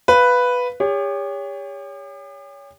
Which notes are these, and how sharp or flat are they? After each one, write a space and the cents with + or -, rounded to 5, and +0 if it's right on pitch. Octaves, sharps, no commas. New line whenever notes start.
B4 +0 F5 +0
G4 +45 C#5 +25